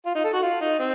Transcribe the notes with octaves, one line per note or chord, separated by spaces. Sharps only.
F4
D#4
A4
F#4
F4
D#4
C4